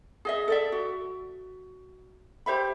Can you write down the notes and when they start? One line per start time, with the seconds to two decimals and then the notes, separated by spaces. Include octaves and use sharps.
0.25 G#4 D#5 E5
0.48 A4 D5 E5
0.72 F#4
2.46 G4 C5 E5 B5